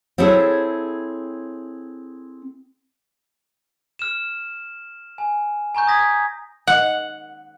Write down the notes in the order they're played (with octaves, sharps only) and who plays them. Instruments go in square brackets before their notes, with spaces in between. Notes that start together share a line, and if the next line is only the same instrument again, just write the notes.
[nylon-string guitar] C4 E4 G#4 A4 C#5
[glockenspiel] F6 E7
G#5
G#5 A#5 C#6 G6
D#6 G#6 A#6 B6
[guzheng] F#5